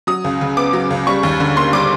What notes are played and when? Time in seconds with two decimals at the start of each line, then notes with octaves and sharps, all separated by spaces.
0.07 F#3 D#6
0.24 C#2
0.41 C#3
0.57 B3 D6
0.73 F#3
0.90 C#2
1.07 G3 C#6
1.23 D#2
1.40 D3
1.56 A#3 C6
1.73 G3 D6